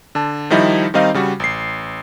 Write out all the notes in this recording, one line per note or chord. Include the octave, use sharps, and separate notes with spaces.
D3 A5
D#3 F3 G3 D#4 E4
D#3 G3 C4 D#4 D#5 F5
C#3 G3 F#4
A1 C7